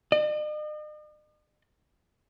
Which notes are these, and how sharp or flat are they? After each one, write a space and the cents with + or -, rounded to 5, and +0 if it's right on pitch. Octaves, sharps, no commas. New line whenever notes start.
D#5 -45